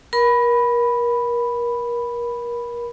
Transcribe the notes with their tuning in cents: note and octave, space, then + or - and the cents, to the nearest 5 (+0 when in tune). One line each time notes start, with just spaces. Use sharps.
A#4 +30 B5 +0